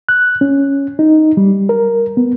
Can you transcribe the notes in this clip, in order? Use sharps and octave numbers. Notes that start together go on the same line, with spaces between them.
F#6
C#4
D#4
G3
A#4
B3